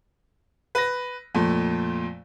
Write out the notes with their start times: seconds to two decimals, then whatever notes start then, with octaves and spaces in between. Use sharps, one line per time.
0.75 B4 A#6
1.35 F2 A#2 A3